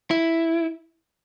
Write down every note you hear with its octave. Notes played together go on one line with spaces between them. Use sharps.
E4